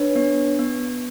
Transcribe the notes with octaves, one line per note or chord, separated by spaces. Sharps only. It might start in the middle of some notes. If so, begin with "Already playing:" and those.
Already playing: D4 B4 C#5
B3
B3